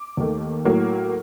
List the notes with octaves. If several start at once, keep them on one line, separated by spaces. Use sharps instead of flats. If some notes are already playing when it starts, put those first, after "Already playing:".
Already playing: D6
D#2 D#3 A3
A2 F#3 A#3